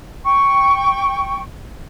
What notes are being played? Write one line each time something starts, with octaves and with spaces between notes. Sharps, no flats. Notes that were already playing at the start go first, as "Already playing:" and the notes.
G5 C#6